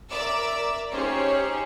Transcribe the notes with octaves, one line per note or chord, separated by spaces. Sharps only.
A#4 D5 E5 A#5 D6 E6
C#4 D#4 G4 G#4 C5 C#5